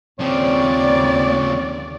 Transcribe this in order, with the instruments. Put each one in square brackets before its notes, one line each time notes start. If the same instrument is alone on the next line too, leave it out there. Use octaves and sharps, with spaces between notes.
[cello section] D#2 D5 [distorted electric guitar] C#3 F3 [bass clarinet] C4 [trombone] C#5